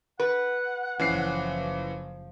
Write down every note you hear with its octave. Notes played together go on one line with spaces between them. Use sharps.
B4 F#5
F#1 E3 F3 C#4 C7